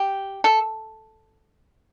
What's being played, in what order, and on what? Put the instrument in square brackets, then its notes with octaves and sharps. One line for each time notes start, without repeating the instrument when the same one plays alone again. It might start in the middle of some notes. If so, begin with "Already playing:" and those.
Already playing: [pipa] G4
A4